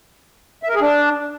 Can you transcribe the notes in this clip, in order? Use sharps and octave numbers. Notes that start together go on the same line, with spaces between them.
E5
A#4
G#4
D4